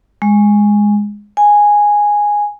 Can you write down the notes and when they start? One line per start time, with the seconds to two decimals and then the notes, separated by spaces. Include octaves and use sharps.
0.22 G#3
1.37 G#5